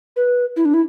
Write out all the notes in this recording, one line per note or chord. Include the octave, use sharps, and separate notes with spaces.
B4
E4
D4
E4